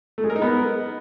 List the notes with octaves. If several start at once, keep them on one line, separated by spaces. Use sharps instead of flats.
A3
G#3
A#4
D#4
B3